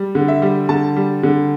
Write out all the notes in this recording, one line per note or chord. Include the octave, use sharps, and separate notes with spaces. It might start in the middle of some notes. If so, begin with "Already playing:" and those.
Already playing: G3
D3
E5
G3
D3 A5
G3
D3